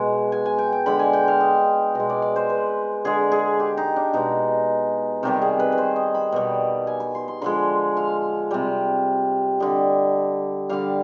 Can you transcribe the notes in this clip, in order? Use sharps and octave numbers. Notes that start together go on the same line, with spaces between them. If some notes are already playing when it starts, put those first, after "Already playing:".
Already playing: B2 G#3
G#5
G#5
G5
G5
D3 G#3 B5
G#5
G5
F5
D#5
B2 G#3 D#5
D5
D5
C5
B4
D3 G#3 G#4
G#4
G4
D#4
D4
B2 G#3 D#4
C3 D#3 G3 G4
G#4
B4
B4
C5
D#5
B5
B2 G3
G#5
B5
C6
C6
D3 F3 G#3 B5
F5
C3 G3
D3 G3 D#5
D3 G3 F5